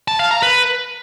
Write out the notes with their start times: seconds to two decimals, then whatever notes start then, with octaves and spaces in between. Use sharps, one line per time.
0.08 A5
0.19 F5
0.31 A#5
0.42 B4